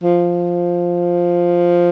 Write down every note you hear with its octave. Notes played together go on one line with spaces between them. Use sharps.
F3